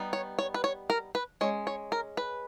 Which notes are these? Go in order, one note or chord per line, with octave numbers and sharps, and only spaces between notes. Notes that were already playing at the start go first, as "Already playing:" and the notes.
Already playing: G3 B3 D#4
C#5
C#5
B4
C#5
A#4
B4
G#3 C#4 C#5
C#5
A#4
B4